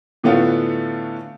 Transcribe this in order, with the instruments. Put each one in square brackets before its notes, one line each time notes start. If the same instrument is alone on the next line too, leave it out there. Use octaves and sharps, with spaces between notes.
[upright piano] A2 D3 A3 B3 C#4 F4